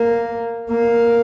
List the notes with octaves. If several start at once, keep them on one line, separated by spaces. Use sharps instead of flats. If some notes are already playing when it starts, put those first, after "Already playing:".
Already playing: A#3
A#3